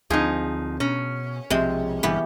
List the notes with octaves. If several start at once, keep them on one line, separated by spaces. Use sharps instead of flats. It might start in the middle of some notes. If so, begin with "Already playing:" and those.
D2 F3 C4 D#4 G#4
B2 C#4 A#5
B1 C3 F3 G#3 C4
G1 G2 B2 E3 B3 G4